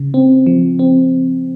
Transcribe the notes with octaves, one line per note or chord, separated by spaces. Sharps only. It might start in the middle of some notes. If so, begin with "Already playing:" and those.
Already playing: C#3
C4
F3
C4